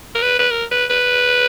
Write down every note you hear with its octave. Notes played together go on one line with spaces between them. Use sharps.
A#4
B4
B4
A#4
B4
B4